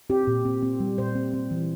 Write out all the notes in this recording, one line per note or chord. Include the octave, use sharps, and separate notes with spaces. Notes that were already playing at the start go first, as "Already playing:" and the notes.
C4 G4
A#2
C4
C4
G3
A#2 C5
C4
C4
E3